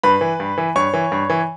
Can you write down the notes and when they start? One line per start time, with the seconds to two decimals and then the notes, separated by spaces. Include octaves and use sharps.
0.03 G2 B4 B5
0.21 E3
0.40 G2
0.58 E3
0.76 G2 C#5 C#6
0.94 E3
1.12 G2
1.30 E3